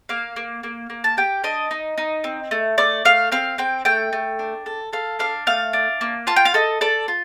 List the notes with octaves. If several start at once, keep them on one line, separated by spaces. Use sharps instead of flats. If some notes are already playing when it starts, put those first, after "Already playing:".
A#3 F5
A#3
A#3
A#3
A5
G4 G5
D4 D#5
D#4
D#4
C4
A3
A3 D5
A3 F5
C4 F5
C4 G5
A3 G5
A3
D4
A4
A4 F5
D4 F5
A3 F5
D4
A#3
F4 A5
G5
F5
A4 D#5
A4 D5
F4